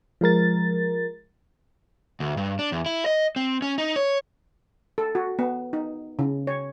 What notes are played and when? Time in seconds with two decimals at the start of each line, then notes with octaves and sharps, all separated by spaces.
0.21 F3 G#3 A#4 A6
2.20 D2
2.37 G2
2.59 D4
2.72 E2
2.86 E4
3.06 D#5
3.36 C4
3.62 C#4
3.78 D#4
3.96 C#5
4.98 A4
5.15 F#4
5.39 B3
5.73 D#4
6.19 C#3
6.47 C#5